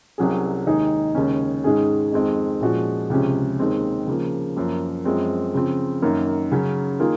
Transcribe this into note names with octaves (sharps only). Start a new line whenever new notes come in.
C2 C3 F#3 C#4 G#4
D#2 D#3 G#3 D#4 G#4
D#2 C#3 G#3 C#4
G#2 D#3 G#3 C#4 G#4
F2 D#3 G#3 C4
A#2 F3 G#3 C#4 F#4
C#2 C3 F3 G#3 C#4
D#2 D#3 G#3 C4
C#3 F3 A#3
F#2 F3 A#3
F#2 F3 G#3 C4
C#3 F3 C4
F#2 D#3 A#3
C#3 F#3 C#4
D#3 A#3 F4 G#4